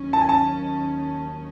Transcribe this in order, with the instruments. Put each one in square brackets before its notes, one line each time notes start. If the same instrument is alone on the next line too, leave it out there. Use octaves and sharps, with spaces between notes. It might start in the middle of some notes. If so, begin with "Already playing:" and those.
Already playing: [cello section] D#2 D#3 F#3 C#4
[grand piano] A5
G#5
A5